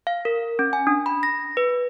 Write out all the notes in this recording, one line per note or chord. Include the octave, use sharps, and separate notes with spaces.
F5
A#4
C#4
G#5
D4
B5
A#6
B4